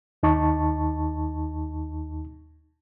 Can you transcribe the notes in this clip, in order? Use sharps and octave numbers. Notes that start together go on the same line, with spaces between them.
D#2 D#4 A5 C#6